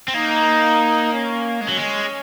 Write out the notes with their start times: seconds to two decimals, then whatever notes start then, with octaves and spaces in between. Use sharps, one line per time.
0.08 C4
0.14 A#3 D#4
1.13 C#4
1.60 G#3 C#4
1.68 F#3
1.77 G#3